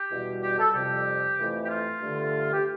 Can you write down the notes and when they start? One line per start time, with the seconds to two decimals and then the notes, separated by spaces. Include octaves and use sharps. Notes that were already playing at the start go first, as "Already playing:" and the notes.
Already playing: G4
0.10 E2 B2 G3
0.42 G4
0.58 A4
0.74 F2 C3 G3 G4
1.37 F2 E3 A3
1.64 G4
1.68 F4
2.00 G2 D3 A3
2.53 G4